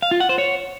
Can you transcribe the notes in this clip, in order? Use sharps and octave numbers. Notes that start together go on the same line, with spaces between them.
F5
F4
F#5
C5
C#5